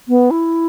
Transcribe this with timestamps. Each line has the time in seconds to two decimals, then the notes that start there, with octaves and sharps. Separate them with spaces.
0.08 B3
0.31 E4